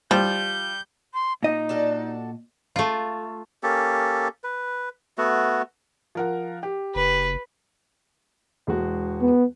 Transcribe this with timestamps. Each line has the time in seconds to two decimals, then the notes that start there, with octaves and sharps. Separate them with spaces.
0.11 F3 G3 G6
1.14 C6
1.43 A#2 D#4 D#5
1.69 D4 F#4 A4
2.76 A3 F4
3.63 A#3 C#4 G4 A4
4.44 B4
5.18 A3 B3 F#4
6.15 F3 A#4 F#5
6.63 G4
6.95 F#1 B4
8.67 E1 G#3 F#4
9.21 B3